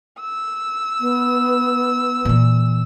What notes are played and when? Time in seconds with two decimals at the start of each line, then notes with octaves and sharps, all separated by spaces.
0.21 E6
1.00 B3
2.25 A#2 E3